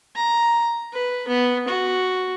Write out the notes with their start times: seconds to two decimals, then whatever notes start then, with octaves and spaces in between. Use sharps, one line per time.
0.16 A#5
0.93 B4
1.28 B3
1.68 F#4